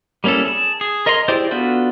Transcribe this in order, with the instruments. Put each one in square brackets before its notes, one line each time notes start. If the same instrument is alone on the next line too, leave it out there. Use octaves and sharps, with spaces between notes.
[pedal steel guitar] G3 A#3 C#4 E4 A4
G#4 A5
G#4
A#4 D#5 G#5 A#5 C6
E4 G4 G#4 C5 D5
B3 D4 F4 F#4 A4